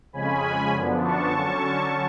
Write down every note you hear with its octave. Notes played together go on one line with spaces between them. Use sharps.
F2 C#3 G#3 C#4 G#5 B5
F#2 D3 F3 B3 D4
A5 C#6
D3 F#3 C#4 A5 C#6